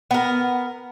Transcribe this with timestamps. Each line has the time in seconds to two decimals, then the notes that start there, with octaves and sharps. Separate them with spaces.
0.11 B3 A#4